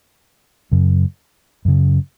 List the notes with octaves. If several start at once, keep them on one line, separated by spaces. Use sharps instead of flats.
F#2 C#3
F#2 C#3